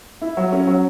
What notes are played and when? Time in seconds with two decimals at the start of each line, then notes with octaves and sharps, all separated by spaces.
0.21 E4
0.37 F#3
0.52 C#4
0.67 F#3